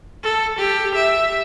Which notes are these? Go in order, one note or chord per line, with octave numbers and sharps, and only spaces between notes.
A4
G4
E5